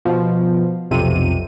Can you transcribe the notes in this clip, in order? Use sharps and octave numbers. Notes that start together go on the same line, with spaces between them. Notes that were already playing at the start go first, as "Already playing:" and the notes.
B2 F3
B1 F2 C3 D#7